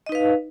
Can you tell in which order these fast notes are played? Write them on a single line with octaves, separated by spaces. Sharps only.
D#5 D#4 B4 F5